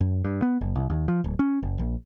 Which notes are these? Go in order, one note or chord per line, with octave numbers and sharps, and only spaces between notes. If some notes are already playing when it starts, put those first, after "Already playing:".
F#2
G2
B3
F#1
C2
D#2
F3
D1
C#4
F#1
A#1